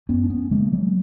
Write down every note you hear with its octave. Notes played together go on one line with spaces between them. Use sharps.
F#2 B3 C#4
D4
B3 C#4
C#3 G#3 A#3
F#3 G#3